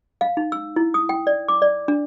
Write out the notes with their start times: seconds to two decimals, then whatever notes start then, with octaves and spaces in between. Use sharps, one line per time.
0.21 F5
0.37 D#4
0.52 E6
0.76 E4
0.94 D#6
1.09 G5
1.27 D5
1.48 D6
1.62 D5
1.88 D4